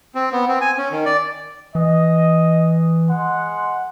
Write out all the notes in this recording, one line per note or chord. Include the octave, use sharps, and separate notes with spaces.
C4
B3
C4
G#5
C#4
D#3
D5
E3 D#5
G#3 F#5 C6